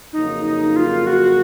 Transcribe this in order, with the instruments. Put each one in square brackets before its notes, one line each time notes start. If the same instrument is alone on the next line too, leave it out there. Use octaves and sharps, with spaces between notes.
[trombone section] F2 C#3 F#3 A#3 [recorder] D#4
[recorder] D#4
F4
F#4